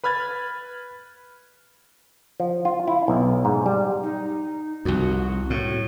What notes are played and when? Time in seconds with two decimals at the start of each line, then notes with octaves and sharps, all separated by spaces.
0.04 B4 B5 F6 G#6 A6
2.40 F3
2.65 F4
2.88 E4
3.08 B1
3.45 G#2
3.66 G3
4.03 D#4
4.85 C2 F2 F#4
5.50 A2